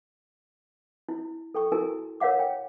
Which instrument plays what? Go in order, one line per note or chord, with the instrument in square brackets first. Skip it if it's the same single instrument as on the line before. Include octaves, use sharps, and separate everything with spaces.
[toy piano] E4
A4 G5 C#6
E4 F#4 A4 A#4 G#5
A#4 C#5 F5 F#5 D6
G5